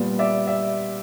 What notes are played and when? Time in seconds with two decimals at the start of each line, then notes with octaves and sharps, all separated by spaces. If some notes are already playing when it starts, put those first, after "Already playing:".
Already playing: A#2 G3 B3
0.19 D5 E5
0.47 D5 E5